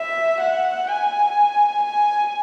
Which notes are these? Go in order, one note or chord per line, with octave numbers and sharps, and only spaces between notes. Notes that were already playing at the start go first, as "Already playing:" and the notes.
Already playing: E5
F#5
G#5
G#5